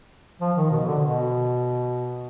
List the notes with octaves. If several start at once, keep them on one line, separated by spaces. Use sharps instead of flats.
F3
D#3
B2
D3
B2